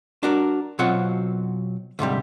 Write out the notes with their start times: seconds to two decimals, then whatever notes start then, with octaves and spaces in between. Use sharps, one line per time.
0.23 D4 F#4 A#4
0.79 B2 F#3 C4 F4 F#5
1.99 D2 G#2 C3 G3